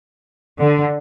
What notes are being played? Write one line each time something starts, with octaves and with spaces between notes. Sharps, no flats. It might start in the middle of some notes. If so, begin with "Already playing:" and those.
D3